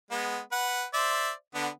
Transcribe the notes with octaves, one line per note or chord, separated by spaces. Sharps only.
G#3 B3
B4 F#5
C5 D5 E5
D3 B3 D4